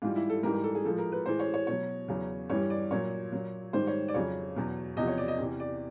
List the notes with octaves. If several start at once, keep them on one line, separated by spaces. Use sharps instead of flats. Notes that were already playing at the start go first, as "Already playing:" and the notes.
G#2 E3 G3 F4
E4
A4
G#2 E3 G3 A#4
A#4
A4
G#4
A2 F3 G#3 A4
A#4
B4
A2 E3 G#3 C5
C#5
C#5
B2 F#3 C#5
E2 C#3 F#3
G2 E3 G3 C#5
D5
A#2 F#3 C#5
A#2 F#3
G#2 D#3 G3 C5
C#5
D5
F2 C#3 F#3 C#5
E2 B2 F#3
E2 C3 F3 D#5
C#5
D5
D#5
E2 C3 E3
D5